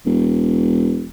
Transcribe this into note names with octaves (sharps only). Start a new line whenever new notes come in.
E1